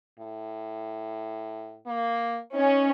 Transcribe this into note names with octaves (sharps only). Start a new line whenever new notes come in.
A2
A#3
C#4 D#4